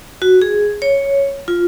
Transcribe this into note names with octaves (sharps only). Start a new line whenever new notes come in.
F#4
G#4
C#5
F4